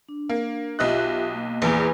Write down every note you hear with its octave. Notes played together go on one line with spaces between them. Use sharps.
D4
A#3
B1 F4 G4 D#5 E5 F#6
A#3
A#1 E2 E3